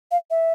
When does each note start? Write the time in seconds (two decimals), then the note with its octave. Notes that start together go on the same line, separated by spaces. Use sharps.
0.11 F5
0.31 E5